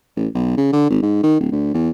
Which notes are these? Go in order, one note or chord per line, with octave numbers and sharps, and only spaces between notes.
A1
B1
C#3
D3
G#1
G#2
D#3
D1
D2
E2